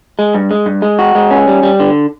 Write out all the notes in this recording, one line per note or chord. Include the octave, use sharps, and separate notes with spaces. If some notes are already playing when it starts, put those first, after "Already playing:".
G#3
G2
G#3
G2
G#3
F#4
G#3
C#4
G3
G3
D3